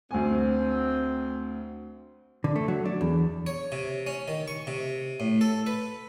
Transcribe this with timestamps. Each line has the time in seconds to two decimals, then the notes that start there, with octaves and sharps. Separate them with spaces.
0.11 D2 C4 G#5
2.44 D3
2.56 A3
2.68 F#3
2.85 D4
3.01 E2
3.47 C#5
3.72 C3
4.07 C#4
4.28 D#3
4.48 C#6
4.67 C3
5.20 A2
5.41 A4
5.66 B4